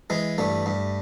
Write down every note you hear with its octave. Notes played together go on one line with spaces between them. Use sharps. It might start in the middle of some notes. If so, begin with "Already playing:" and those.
E3 G#3
G2 A3
G2